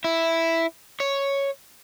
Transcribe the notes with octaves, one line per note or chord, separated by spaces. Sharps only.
E4
C#5